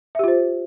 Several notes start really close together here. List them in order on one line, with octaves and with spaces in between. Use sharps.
E5 G4 F4 C5